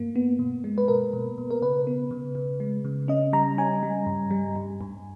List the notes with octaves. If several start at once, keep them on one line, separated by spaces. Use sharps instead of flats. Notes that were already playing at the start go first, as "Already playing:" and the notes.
Already playing: G2 A#3
B3
B2
G#3
B4
B2 A#4
B2
B2
A#4
C#3 B4
B3
C#3
C#3
G#3
C#3
C#4 D#5
G3 A#5
C#4 G#5
G3
G2
G3
G2
G2